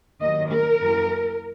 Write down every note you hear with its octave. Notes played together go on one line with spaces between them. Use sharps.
D#2 D#3 F#3 D#5
A#4
F#2 E3 A#3